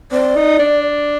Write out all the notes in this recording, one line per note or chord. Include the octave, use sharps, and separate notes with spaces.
C4 D5
D#4
D4